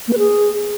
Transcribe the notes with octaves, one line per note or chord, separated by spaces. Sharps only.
A#3
B4
G#4